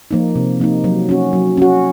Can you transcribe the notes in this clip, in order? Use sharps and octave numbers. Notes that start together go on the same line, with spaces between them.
F3 A#3 D#4
C3
F3 A#3 D#4
F#3
C#4 F#4
F#3
C#4 F#4